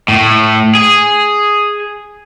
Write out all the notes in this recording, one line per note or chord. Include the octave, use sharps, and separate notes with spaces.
A2
G#4